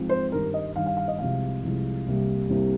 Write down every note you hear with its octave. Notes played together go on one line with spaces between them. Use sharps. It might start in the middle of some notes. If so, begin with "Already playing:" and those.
Already playing: G#2 F3 C4
C5
G2 D#3 G3 A#4
D#5
G2 D#3 G3 F5
F5
F5
D#5
C2 C3 F3 G#3 F5
C2 C3 F3 G#3
C2 C3 G3 A#3
C2 C3 G3 A#3